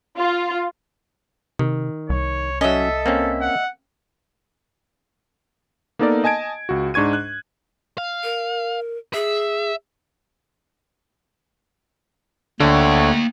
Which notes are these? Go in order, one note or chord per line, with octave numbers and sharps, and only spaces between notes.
F4
C3 D#3
C2 C#5
F#3 C#4 A4 D#5 E5
A#3 C4 C#4
F#5
A#3 B3 D#4 A4 A#4 D5
D#5 G#5 A5 G#6 D7
C#2 F#4
G#2 D4 C#6 G#6 D#7
F#6
F5
A#4
G#4 E5
D2 D3 A#3 C#5 G5